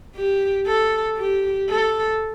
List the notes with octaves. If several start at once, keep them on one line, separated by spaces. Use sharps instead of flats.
G4
A4
G4
A4